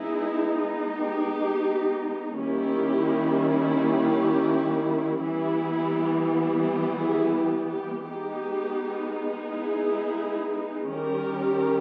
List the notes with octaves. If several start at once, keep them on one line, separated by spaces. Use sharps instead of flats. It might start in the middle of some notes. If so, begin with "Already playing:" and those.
Already playing: G#3 B3 D#4 E4 G#4
G4
D#3 G3 A#3 C#4 E4 G4
G4
E3 G3 B3 E4
G4
E4 G#4
G4
G4
G#3 B3 D#4 G4
E4 G#4
D#3 G3 C#4 G4 A#4